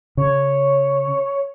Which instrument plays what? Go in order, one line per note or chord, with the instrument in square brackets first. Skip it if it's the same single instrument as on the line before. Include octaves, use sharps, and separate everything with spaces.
[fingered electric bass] C#3 [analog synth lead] C#5